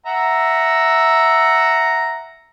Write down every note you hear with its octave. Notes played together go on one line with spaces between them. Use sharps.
E5 F#5 A#5